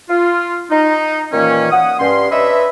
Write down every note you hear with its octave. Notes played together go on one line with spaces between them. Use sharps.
F4
D#4
A#2 D#3 E3 A#3 C#4
F#5 D#6
G2 C#4 C6
D4 B4 C#5 D#5 E5